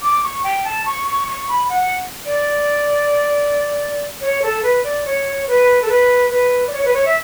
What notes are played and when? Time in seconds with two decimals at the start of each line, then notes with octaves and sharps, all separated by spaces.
0.02 D6
0.23 C#6
0.44 G5
0.65 A5
0.86 C#6
1.07 C#6
1.28 C#6
1.49 B5
1.69 F#5
2.26 D5
4.21 C#5
4.42 A4
4.63 B4
4.84 D5
5.05 C#5
5.48 B4
5.82 A4
5.89 B4
6.31 B4
6.67 D5
6.73 C#5
6.85 B4
6.94 C#5
7.05 E5